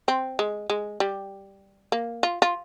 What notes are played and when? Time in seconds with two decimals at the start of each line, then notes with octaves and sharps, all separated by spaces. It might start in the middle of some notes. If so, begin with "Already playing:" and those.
0.08 C4
0.39 G#3
0.70 G#3
1.00 G3
1.92 A#3
2.23 F4
2.42 F4